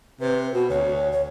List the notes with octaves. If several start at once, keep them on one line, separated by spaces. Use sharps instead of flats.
C3 B4
B2 F#4
D2 C#5
C#5